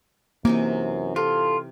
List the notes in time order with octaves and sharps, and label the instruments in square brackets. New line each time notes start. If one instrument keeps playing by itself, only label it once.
[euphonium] F#2 [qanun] C3 E3 D#4 [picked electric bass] A#3
[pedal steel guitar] F4 [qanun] G4 [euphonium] A4